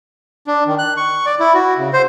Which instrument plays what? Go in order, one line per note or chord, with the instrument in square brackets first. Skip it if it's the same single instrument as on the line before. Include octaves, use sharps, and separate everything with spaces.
[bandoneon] D4
D#3
F#6
C#6
D5
E4
F#4
C#3
C5